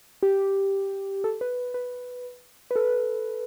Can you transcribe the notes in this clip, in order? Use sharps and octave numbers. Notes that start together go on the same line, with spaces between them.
G4
A4
B4
B4
B4
A4